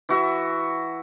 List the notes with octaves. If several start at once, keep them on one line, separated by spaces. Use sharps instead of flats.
E3 F#4 E5